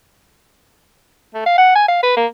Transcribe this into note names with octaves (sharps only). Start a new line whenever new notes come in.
A3
F5
F#5
G#5
F5
B4
A#3